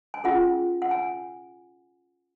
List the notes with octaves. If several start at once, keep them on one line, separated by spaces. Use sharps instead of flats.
G#5
C#4 F4 G#4 F#5
F#5
G#5